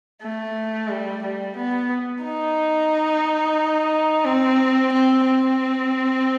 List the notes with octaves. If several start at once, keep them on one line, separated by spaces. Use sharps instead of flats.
A3
G3
G3
B3
D#4
C4
C4
C4